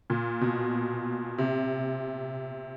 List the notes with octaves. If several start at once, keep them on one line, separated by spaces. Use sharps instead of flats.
A#2
B2
C3